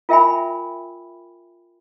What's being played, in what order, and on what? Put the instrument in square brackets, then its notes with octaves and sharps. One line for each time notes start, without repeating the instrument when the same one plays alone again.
[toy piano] F4 A#4 E5 G5 G#5 B5